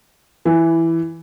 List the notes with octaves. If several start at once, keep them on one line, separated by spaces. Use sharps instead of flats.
E3